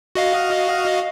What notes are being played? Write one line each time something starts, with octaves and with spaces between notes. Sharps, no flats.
F#4 D#5 F5